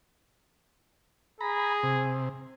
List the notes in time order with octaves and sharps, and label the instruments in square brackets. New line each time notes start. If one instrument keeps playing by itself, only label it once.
[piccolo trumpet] G#4 [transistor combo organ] A#5 B5
[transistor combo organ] C3